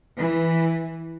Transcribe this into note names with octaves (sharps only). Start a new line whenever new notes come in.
E3